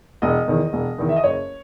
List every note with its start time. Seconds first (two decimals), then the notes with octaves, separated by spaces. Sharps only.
0.22 E1 D#5
0.48 E2 D#3
0.73 E1
0.98 E2 D#3
1.09 E5
1.16 D#5
1.24 F#1 C#5